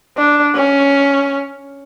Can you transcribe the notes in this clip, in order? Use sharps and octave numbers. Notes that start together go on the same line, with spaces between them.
D4
C#4